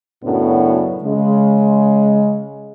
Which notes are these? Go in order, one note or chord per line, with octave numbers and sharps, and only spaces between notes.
F#2 A2 C#3 F#3 B3 D4
C#3 G#3